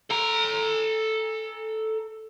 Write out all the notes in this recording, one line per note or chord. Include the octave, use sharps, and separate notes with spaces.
A4 A#5